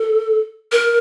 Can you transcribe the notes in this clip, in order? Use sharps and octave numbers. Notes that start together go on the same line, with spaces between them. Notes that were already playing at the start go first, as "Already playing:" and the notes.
Already playing: A4
A#4